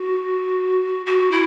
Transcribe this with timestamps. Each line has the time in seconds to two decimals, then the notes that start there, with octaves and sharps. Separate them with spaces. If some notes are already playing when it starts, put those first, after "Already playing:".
Already playing: F#4
1.06 F#4
1.31 E4